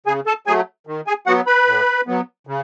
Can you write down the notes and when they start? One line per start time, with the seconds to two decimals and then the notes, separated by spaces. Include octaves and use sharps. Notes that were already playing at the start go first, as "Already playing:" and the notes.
0.06 C#3 G#4 G#5
0.26 A4 A5
0.47 F#3 A3 G#4 G#5
0.87 D#3
1.07 G#4 G#5
1.26 F#3 B3 F#4 F#5
1.47 B4 B5
1.67 A2
2.07 F#3 B3
2.47 C#3